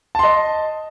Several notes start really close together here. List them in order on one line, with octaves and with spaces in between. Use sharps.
A5 C6 D#5